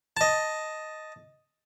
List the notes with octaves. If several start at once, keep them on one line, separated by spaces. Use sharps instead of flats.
D#5 A5